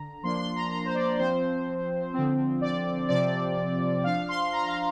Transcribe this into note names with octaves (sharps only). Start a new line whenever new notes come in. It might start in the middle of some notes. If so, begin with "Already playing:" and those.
Already playing: D3 A#5
F3 A#3 D4 C6
C6
A#5
A#5
C5
D5
F3 C4 C5
D3 F3 C4
D5
C3 F3 C4 D5
F3 D4 F5
C6
A#5
F5